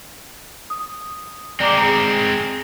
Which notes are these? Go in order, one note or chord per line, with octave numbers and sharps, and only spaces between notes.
D#6
G#3 C4 D5 A#5 D6
G#4 A#5